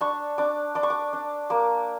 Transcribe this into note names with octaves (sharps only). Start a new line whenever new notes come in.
D4 C#6
D4 D6
D4 D6
C#6
D6
D4
A#3 D6